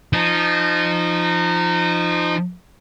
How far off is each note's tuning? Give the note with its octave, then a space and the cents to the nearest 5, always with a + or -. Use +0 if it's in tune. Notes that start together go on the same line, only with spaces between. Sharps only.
F3 -15 D#4 -25